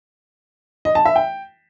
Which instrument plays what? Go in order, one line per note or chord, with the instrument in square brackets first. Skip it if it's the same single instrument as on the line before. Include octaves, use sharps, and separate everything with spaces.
[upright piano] D#5
A5
E5
G5